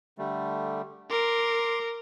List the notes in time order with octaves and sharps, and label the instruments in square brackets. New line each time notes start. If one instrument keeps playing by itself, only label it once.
[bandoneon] D3 G3 A3
[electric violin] A#4 [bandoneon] C6 D6